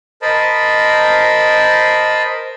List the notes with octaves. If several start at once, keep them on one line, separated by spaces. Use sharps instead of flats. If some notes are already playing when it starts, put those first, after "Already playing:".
A#4 C5 D#5 A5 B5